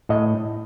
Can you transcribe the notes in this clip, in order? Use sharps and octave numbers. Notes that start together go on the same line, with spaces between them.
A2 D#5